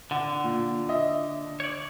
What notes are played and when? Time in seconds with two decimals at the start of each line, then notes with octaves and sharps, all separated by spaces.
0.11 D3 F#5
0.44 A#2
0.89 D#5 E5
1.60 C#5 D5